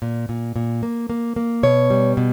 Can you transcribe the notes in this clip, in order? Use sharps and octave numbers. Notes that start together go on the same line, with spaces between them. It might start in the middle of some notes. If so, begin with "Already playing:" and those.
A#2
A#2
A#2
A#3
A#3
A#3
B2 C#5
G3
B2